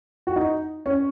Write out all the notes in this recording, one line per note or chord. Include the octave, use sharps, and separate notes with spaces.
F#4
D#4
C#4